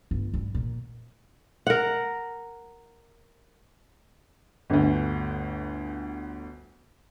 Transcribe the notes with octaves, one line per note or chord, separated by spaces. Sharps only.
G1
G2
A#2
A#4 F#5
G1 D2